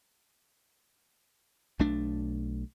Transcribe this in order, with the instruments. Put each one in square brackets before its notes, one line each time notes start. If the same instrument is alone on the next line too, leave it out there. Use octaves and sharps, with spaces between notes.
[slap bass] B1 B2 A3 D4